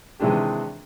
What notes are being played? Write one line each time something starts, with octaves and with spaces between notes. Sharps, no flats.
C3 D#3 E3 G#3 D4 G4